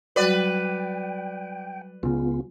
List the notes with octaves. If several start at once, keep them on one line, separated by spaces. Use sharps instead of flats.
F#3 G3 F#4 B4 D5 G5
C#2 C#3 B3 F4